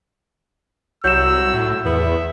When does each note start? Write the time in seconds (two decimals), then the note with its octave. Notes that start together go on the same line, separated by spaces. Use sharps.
1.04 C2 F#3 E6 G6 E7
1.53 A2
1.85 E2 B3 E5